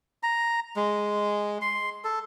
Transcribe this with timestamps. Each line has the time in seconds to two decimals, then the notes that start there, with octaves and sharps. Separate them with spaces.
0.23 A#5
0.76 G#3
1.61 C6
2.04 A4